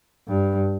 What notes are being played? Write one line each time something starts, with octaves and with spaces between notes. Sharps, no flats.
G2